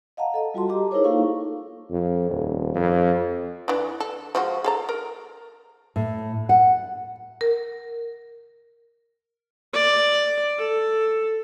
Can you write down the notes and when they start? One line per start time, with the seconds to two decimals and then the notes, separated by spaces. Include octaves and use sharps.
0.17 D#5 F5 F#5 A5 A#5
0.34 A4 D#5
0.54 G3 F4 F#4 A5 C6
0.69 G4 D#5 A#5 D6
0.91 D#4 E4 G#4 A#4 C5 C#5
1.04 A#3 D#4 F4 A4 F5 C#6
1.90 F2
2.30 D#1
2.74 F2
3.68 E3 D4
4.00 A4
4.35 F3 G#3 F#4
4.64 G#4 A4 A#5
4.89 A#4
5.96 A2
6.49 F#5
7.41 A#4
9.74 D5
10.58 A4